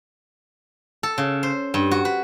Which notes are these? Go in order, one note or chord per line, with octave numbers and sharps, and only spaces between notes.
A4
C#3
C5
G2
F#4
B4